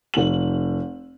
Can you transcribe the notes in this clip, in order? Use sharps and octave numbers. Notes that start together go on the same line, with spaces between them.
F1 F#7